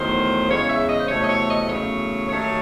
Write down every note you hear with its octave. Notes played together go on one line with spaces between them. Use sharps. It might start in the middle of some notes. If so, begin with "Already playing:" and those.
Already playing: E2 D#3 F#3 A3 C5
E2 C#3 G#3 C#5
E5
D#5
C5
E2 C3 F#3 A3 C#5
D#5
C#5
D#5
E2 C#3 F#3 A3 C#5
D#2 D#3 F#3 A3 C#5